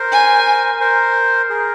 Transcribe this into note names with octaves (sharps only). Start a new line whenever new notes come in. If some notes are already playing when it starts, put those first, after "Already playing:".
Already playing: A#4 C5
G#5
A#4 C5
G#4 A#4